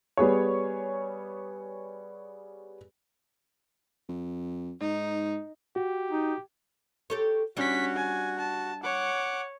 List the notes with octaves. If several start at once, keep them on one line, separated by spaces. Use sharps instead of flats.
G3 B3 G#4 C#5
F2
G#2 D#4
F#4 G4
D#4
G4 A4 C#5
G3 C#4 D4 F#4 B6
G#5
A5
C#5 F#5 D6